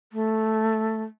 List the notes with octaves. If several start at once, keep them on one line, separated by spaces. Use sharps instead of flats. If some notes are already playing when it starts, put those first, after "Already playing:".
A3